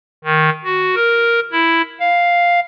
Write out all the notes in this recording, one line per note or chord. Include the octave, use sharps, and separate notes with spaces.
D#3
F#4
A#4
E4
F5